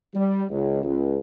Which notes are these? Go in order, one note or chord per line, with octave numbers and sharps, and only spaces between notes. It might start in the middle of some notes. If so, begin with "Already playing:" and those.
G3
C#2
C#2